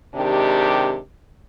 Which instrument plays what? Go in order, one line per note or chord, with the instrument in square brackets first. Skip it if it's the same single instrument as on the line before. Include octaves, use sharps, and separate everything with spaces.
[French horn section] C3 D#3 G#3 D4 G4